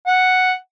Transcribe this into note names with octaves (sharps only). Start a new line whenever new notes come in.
F#5